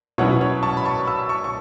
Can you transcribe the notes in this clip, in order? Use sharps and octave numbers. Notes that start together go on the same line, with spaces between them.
B2 F#3 C#4 E4 C#5 F#5
C#5
A5 C#6
B5
A5 C#6
B5 E6
A5 C#6
C#6